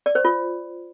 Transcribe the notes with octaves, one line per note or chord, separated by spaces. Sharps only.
D5
C5
F4